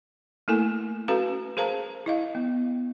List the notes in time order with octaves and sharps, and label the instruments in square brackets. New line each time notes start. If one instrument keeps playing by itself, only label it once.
[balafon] A3 A#3 E4 A4 A#4 G#5
C#4 F#4 A4 B4 F5 A#5
G#4 A#4 C5 F5 A5 A#5
E4 D#5 F5
B3